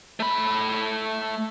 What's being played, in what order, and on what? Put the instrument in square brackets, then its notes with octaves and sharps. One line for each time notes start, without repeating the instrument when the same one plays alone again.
[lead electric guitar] A3 B5